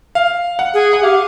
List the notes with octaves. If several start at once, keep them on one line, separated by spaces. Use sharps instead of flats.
F5
F#5
G#4
F#5
G4 F5